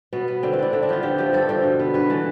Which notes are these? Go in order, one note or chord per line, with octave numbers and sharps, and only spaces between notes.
B2 B3
B3
D3 C4
E4
A3 D4
D3 C4
D4
F3 B3 F4
D3 G4
F3 A3 G4
G2 A4
D3 F3
B2
B3
G2 B4
E3 A3